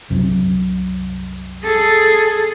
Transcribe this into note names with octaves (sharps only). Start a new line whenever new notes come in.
C2 F#2
G#4 A4